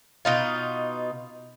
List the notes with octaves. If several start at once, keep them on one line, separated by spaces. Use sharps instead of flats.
B2 D#4 F4